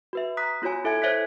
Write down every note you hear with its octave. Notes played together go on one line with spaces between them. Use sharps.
F#4 B4 E5
A#5 D#6 F#6 B6
B3 F4 F#4 C#5 G#5
E4 A4 E5 G#5 G#6
C5 C#5 E5 F#6 G#6 B6